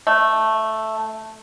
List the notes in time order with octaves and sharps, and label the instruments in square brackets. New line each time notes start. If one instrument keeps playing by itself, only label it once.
[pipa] A3